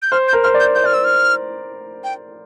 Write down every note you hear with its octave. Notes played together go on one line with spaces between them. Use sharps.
G6
C5 F6
G6
A#4
C5 F6
D5
G6
C5 G6
D5 F6
C5 E6
F6
G5